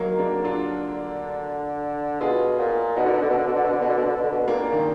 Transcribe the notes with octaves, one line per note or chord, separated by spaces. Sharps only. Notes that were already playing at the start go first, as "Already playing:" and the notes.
Already playing: D#3 F#3 A#3
A#3 D4
D3
D4 F4
B2 F4 G#4
A#2
B2 D#4 F#4
D3
B2
D3
B2
D3
B2
D3
B2
D3
B2
D3
B2
D3
B2
D3
B2
A#2 A#3 D4
D#3